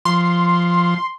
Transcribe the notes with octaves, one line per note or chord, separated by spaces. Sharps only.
F3 C6